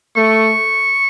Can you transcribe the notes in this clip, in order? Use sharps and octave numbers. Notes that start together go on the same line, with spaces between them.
A3 C#6